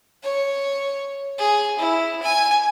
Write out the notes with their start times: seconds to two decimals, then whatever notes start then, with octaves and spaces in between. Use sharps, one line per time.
0.23 C#5
1.38 G#4
1.79 E4
2.23 G#5